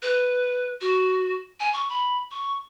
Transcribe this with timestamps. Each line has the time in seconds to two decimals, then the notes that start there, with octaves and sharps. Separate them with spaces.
0.02 B4
0.81 F#4
1.60 G#5
1.73 C#6
1.89 B5
2.31 C#6